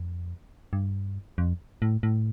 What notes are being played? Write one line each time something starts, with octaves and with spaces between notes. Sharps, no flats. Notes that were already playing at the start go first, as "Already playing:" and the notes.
Already playing: F2
G2
F2
A2
A2